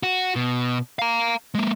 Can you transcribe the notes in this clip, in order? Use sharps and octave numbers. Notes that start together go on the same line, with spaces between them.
F#4
B2
F5 A#5
G#3 A#3